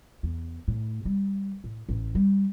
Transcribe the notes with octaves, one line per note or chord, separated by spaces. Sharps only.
E2
A2
G3
A2
A1
G3